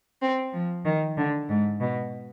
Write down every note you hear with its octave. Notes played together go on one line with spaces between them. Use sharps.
C4
F3
D#3
D3
G#2
B2